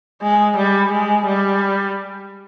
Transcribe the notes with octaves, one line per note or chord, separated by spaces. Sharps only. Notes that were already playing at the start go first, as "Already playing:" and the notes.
G#3
G3
G#3
G3